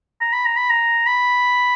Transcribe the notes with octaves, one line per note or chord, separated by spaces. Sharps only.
A#5
B5
A#5
B5
A#5
B5